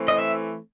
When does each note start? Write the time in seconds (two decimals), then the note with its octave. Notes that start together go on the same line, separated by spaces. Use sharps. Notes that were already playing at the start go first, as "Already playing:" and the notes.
Already playing: E3 A3 C4
0.08 D#5
0.18 E5